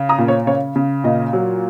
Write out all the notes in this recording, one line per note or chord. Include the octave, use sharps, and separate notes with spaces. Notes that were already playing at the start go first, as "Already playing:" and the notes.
Already playing: C#3
A#5 D#6
A#2
C#5
C#3 C#5
C#3
A#2 D#5
F#3